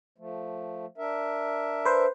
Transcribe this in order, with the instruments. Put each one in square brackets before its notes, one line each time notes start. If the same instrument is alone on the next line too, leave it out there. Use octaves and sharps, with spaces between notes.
[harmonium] F3 A3
D4 A#4 E5
[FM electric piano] B4 C5